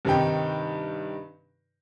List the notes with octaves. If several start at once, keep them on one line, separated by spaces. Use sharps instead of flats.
G2 C3 D#3 D#4 G5